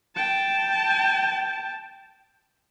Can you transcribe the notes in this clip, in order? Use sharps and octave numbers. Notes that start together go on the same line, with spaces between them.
G5 A5